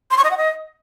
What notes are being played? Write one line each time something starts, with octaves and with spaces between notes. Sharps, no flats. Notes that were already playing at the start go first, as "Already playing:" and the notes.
C6
C#6
D#5
F#5
D#5